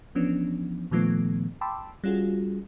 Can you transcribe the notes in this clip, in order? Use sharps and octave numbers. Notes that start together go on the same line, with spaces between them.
E3 F3 B3 C#4 D4
A#2 D#3 F3 A3 B3
G5 A5 B5 C6 D6 E6
G3 C#4 F4 F#4 G#4